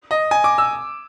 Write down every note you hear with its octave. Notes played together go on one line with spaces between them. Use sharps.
D#5
G#5
D6
E6